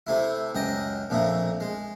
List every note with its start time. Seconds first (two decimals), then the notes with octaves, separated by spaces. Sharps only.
0.07 C3 A3 E4
0.55 C#2 F#2 D#5 G5
1.10 A#1 F2 A#2 A3
1.60 G#3